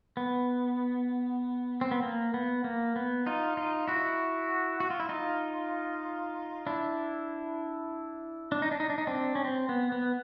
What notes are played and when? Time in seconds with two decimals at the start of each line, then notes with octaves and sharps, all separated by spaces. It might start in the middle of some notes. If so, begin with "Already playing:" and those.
0.17 B3
1.81 C4
1.91 B3
2.03 A#3
2.34 B3
2.64 A#3
2.96 B3
3.26 D#4 F4
3.57 D#4 F4
3.88 E4 F#4
4.80 F#4
4.90 F4
5.00 E4
5.09 D#4 F4
6.67 D4 E4
8.52 D4
8.62 D#4
8.71 D4
8.80 D#4
8.90 D4
8.98 D#4
9.07 C4 D4
9.35 C#4
9.45 C4
9.69 B3
9.92 B3